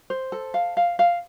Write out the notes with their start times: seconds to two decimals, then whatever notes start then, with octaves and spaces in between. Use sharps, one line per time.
0.10 C5
0.32 A4
0.54 F5
0.77 F5
0.99 F5